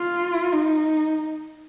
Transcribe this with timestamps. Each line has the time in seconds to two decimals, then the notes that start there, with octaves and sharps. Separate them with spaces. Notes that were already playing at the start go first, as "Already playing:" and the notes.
Already playing: F4
0.53 D#4